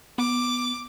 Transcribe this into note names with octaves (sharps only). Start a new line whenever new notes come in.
B3 D6